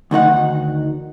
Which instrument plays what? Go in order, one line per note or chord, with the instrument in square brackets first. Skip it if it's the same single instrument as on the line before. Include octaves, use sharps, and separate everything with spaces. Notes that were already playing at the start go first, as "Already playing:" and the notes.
[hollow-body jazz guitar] D2 D#3 D#4 F#5